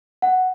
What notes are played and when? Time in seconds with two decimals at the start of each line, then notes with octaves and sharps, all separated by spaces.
0.22 F#5